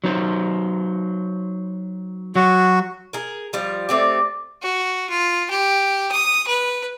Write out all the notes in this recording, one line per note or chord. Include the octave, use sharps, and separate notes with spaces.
F#3 D#4 C5
F#3 F#4
G#4 A#4
F3 G3 F4
A3 C4 G4 D5
F#4
F4
G4
D#6
B4